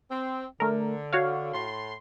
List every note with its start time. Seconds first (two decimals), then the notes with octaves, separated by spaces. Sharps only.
0.11 C4
0.60 D3 A3 A#4
1.13 F#4 C#5 F5
1.54 A2 C6